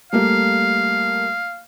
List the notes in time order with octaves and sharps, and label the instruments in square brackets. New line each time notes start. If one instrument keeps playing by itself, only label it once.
[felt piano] G3 A3 A#3 [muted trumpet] F5